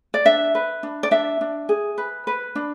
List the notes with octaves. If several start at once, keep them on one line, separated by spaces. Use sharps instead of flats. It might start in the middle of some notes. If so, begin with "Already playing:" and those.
D5
D4 E5
B4
D4
D5
D4 E5
D4
G#4
B4
B4
D4